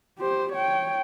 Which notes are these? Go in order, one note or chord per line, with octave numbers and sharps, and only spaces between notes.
G4 C5
C#5 G5